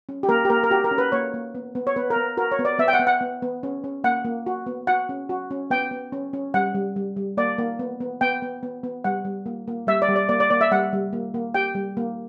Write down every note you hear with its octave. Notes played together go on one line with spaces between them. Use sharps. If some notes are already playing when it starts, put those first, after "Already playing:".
C#4
G4
A#3 A#4
G4
A#3 A#4
A#4
F#4 G4
A#4
C#4
B4
A#3 C#5
A#3
B3
B3
C#5
B3 B4
A#4
B3
F#4 A#4
C#5
B3
D5
B3 E5
G5
F#5
B3
F#5
B3
B3
C#4
C#4
A#3 F#5
A#3
F#4
B3
F#4 F#5
C#4
F#4
C#4
B3 G5
B3
C#4
C#4
G3 F#5
G3
G3
G3
A#3 D5
A#3
B3
B3
B3 G5
B3
B3
B3
G3 F#5
G3
A#3
A#3
G3 E5
D5
G3
D5
A#3 D5
D5
A#3 D5
E5
G3 F#5
G3
A#3
A#3
G4 G5
G3
A#3